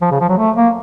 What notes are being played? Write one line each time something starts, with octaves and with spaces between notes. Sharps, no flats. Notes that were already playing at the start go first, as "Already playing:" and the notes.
F3
C#3
F3
F#3
A3
A#3